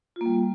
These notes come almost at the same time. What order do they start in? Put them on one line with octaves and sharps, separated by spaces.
F4 A#3 G3